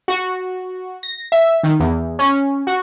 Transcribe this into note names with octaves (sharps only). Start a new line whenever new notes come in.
F#4
A#6
E5
D#3
E2
C#4
F#4